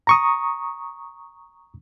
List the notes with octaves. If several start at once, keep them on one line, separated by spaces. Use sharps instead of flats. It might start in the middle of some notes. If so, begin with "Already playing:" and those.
A#5 C#6 D#6